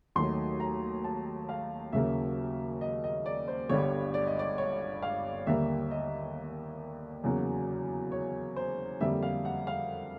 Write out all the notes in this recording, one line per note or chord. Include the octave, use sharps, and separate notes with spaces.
D#2 D#3 F#3 A3 C6
A#5
A5
F5
D#2 C#3 F#3 A#3 E5
D#5
D#5
D5
C5
G1 G2 D3 G3 C#5
D5
D#5
D5
C#5
F5
D#2 D3 G3 A#3 E5
D#5
E2 C#3 F#3 A#3
C#5
C5
F2 D3 G3 A#3 E5
F5
F#5
F5